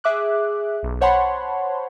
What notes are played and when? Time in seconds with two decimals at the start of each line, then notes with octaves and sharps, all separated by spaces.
0.04 G#4 E5 D6 F#6
0.83 B1
1.01 C5 C#5 F#5 A5 B5 C6